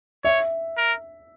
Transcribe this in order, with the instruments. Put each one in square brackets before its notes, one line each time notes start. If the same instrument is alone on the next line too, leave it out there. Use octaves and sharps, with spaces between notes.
[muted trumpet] C#5 [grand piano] E5
[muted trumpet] A#4